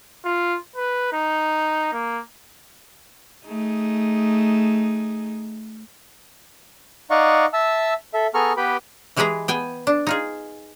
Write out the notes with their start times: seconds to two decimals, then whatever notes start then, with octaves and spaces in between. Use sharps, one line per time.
0.25 F4
0.76 B4
1.13 D#4
1.93 A#3
3.46 A3 D#4 G#4
7.10 D#4 D5 D#5 F5 F#5 C#6
7.53 E5 A5 E6
8.14 A4 E5
8.34 B3 G#4 A4 A#5 C#6 F6
8.57 B3 G4 B4 G5 B5
9.17 E3 G#3 G4 G#4 B4 A#5
9.48 B3 G5 G#5
9.87 D4
10.07 D#4 F4 G#4